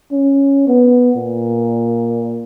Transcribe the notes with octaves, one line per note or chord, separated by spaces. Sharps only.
C#4
B3
A#2